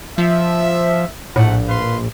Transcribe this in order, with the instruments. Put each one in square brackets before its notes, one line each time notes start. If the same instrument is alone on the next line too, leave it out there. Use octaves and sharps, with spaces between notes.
[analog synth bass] F3 [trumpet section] E5
[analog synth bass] A#1 [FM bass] A2 [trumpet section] A3 F#5
[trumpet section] B4 F5 C6